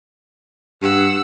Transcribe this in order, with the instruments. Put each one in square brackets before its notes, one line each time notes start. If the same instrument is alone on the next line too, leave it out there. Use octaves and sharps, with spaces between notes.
[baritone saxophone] G2 [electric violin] F#5 E6